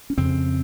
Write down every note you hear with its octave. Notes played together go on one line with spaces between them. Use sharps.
C#4
F2 C#3 C4